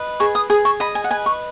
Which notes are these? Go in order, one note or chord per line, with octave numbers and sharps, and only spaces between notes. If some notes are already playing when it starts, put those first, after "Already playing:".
Already playing: B4 D#5
G#4 C#6
D#6
G#4 D#6
C#6
D#5 B5
G#5
F#5
B4 G#5
C#6